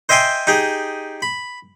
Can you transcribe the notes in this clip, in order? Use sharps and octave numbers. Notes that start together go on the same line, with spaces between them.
C5 D#5 E5 G5 G#5 C6
D#4 G4 G#4
B5